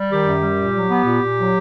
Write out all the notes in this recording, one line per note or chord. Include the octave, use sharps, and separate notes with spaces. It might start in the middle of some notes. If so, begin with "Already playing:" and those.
Already playing: G3
D#3 G4
F#2
G3
A#2
F#3
B3
A#2
A#2
F#3